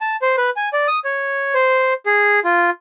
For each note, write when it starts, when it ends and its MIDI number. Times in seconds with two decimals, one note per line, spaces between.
0.01 0.16 81
0.22 0.36 72
0.37 0.50 71
0.56 0.69 80
0.73 0.87 74
0.88 1.00 87
1.04 1.54 73
1.54 1.94 72
2.06 2.40 68
2.44 2.70 65